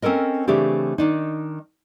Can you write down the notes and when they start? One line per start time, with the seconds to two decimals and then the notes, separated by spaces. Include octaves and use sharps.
0.02 C4 C#4 A4 A#4 D#5
0.47 C#3 E3 A3 C4 D4 G4
0.98 D#3 D4 D#4